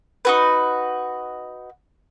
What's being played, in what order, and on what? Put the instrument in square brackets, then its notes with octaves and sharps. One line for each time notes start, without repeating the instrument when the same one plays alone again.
[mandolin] D#4 F#4 B4